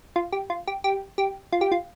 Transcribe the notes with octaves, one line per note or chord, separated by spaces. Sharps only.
F4
G4
F4
G4
G4
G4
F4
G4
F4